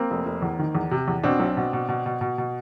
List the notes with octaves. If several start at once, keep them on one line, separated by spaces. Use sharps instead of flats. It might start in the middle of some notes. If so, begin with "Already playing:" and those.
Already playing: A#3 C4
F1
F1
E2
D#3
E2
C3
E2
B2 C4 D4
B1
B2
B2
B2
B2
B2
B2